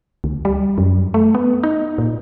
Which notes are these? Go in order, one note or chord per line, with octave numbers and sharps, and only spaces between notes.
D2
G3
F#2
A3
B3
D#4
A#2